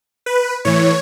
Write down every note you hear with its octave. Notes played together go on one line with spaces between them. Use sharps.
B4
A2 E3 C#5